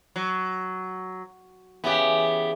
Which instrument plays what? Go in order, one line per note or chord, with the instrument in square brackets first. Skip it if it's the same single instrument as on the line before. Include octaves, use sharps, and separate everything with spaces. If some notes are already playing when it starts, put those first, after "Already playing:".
[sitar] F#3
[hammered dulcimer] C#3 E3 [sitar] B3 G4